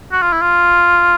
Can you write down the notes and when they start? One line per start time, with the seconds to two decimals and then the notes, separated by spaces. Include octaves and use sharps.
0.12 F#4
0.22 F4
0.33 E4
0.42 F4